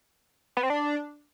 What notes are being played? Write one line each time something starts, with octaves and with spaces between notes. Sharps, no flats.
B3
C4
D4